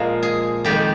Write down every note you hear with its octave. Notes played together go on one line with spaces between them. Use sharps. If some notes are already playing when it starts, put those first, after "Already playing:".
Already playing: A#2 F3 G#3 A#4
G#4
F2 D#3 G#3 G4